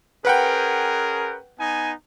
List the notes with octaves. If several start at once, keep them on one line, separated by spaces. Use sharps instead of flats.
C#4 G#4 A#4 B4 F#5 G5
B3 D#4 G#5